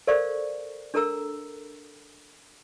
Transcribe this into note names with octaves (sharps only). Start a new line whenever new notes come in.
A4 A#4 C5 D5 F5 C#6
D4 A4 A#4 A#5 E6